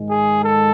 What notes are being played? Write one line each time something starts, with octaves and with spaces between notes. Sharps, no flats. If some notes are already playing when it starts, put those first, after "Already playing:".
Already playing: G#2 D#3 G#3
G#4
A4